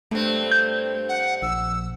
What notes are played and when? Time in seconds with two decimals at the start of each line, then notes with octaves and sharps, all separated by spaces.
0.11 G2 A3 C4
0.51 G6
1.09 F#5
1.42 A#1 E6